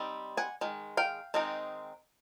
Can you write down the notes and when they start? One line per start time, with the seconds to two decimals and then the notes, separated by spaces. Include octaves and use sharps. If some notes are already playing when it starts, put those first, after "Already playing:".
Already playing: G3 C4 D#4
0.37 F#5 G#5
0.61 D#3 G#3
0.97 F5 G5
1.34 D#3 G#3 C4 D#4